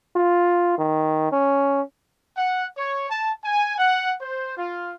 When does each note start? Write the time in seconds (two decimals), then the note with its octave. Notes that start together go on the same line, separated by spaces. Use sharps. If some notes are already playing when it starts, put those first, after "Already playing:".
0.16 F4
0.78 D#3
1.32 C#4
2.37 F#5
2.77 C#5
3.10 A5
3.44 G#5
3.78 F#5
4.21 C5
4.57 F4